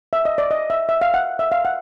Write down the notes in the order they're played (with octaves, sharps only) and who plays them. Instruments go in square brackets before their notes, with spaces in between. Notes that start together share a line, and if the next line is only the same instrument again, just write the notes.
[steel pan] E5
D#5
D5
D#5
E5
E5
F5
F#5
E5
F5
F#5